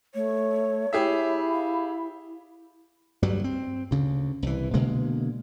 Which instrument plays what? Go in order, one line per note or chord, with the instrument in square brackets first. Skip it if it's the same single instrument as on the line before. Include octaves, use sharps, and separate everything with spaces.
[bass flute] A3 [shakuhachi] C#5
[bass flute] E4 [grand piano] G4 G#4 E5
[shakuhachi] F5
[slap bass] D2 G2 F#3 G3
C4
D2 C#3
C2 E3
B2 D3 G#3 A#3